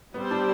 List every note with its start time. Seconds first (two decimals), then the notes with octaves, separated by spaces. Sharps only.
0.14 G3 B3 C4 G4 C5
0.31 D4